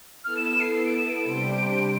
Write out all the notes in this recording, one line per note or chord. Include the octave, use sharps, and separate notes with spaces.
B3 E4 A4 F6
E7
E7
C7
C7
D7
E7
D7
C3 G3 D4 G4 C5